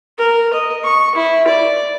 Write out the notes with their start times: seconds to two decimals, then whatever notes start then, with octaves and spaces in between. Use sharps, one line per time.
0.18 A#4
0.53 D#5
0.84 C#6
1.15 E4
1.48 D5